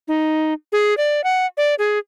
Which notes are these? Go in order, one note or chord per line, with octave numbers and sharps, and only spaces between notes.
D#4
G#4
D5
F#5
D5
G#4